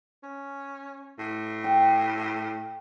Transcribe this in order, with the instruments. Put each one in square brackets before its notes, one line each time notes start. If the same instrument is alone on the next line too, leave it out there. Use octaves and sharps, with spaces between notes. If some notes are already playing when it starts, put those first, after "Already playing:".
[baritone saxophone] C#4
A2
[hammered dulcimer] G5